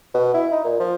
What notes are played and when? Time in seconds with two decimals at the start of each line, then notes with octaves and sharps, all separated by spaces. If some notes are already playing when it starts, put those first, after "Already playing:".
0.14 B2
0.34 E4
0.52 D#4
0.64 A#2
0.79 F3